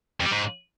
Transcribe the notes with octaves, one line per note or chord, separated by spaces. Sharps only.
F2
G3
G#2